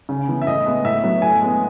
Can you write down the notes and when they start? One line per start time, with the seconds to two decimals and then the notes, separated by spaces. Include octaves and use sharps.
0.09 C#3
0.28 E3 B3
0.42 E5
0.47 A2 D#5
0.66 G#3 B3
0.85 A2 E5
1.03 F#3 B3
1.22 A2 G#5
1.41 G#3 B3